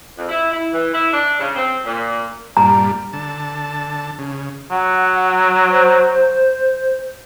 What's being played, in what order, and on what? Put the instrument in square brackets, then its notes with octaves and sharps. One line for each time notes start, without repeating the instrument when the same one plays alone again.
[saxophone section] F2
E4
E4
E3
E4
D4
C#3
C4
A#2
[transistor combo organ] G2 A#2 G3 [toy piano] A#5
[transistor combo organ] D3 A5
C#3
[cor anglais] F#3 [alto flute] F#5
[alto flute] C5